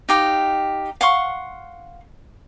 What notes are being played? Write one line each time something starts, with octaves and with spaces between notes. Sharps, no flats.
D#4 G4 F5
F5 F#5 C6 C#6